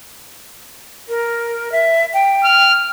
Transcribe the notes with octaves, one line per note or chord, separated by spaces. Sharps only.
A#4
E5
G5
F6